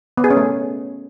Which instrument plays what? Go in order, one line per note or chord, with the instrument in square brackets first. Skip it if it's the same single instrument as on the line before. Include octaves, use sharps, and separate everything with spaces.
[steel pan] B3
G#4
C#4
A3